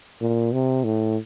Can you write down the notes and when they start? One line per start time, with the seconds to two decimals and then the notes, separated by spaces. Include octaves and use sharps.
0.21 A#2
0.53 C3
0.84 A2